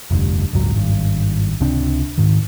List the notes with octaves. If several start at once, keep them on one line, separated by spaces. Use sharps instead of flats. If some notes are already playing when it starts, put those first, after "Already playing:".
F1 D2 G2
F#1 C#2 G#2 F#3
G#1 G2
C#2 C3 C4 D4
G#2 D#3